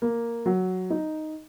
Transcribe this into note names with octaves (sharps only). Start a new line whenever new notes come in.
A#3
F#3
D#4